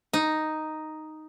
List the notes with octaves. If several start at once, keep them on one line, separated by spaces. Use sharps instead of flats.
D#4